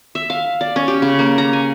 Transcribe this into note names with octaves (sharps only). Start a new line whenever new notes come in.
E5
F5
D5
C#4
G4
C#3
A#3
A#5
G#5